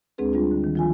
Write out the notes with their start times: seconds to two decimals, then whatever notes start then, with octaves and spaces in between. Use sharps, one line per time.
0.18 D2 G#3 C4 D4 G#4 B4
0.33 G3 D4 F4
0.51 D3
0.64 D#3
0.75 F3 F4 G#5